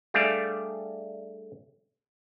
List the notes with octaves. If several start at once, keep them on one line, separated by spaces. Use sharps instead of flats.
G3 A3 D4 G#4 D5 F5